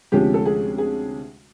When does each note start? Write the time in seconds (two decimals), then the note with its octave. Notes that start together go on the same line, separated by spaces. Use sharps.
0.12 D2 C3 F3 G#3 C#4 G4
0.34 A4
0.46 G#4
0.78 G#4